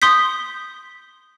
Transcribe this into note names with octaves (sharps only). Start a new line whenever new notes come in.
C6 D#6 G6 B6